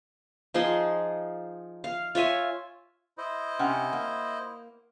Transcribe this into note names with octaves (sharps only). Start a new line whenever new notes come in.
F3 D#4 G#4 C6
F5
F4 C#5 E5 G#5
E4 C5 D#5
C3 C#4 F#5
A#3